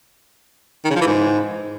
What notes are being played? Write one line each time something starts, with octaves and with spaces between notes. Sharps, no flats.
D#3
C#3
F3
E3
G#2